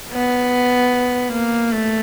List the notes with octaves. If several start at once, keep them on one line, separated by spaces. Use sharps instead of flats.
B3
A#3
A3